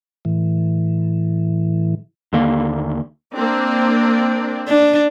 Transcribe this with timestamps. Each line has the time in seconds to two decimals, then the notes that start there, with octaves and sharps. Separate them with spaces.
0.25 A2 E3
2.33 D#2 D3 A#3
3.33 A#3 C4 D4
4.68 D4